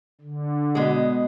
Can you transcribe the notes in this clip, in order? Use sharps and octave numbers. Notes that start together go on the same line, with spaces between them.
D3
B2 G#3